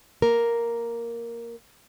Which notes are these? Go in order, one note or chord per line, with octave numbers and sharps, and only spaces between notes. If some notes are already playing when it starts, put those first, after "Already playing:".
A#3 A#4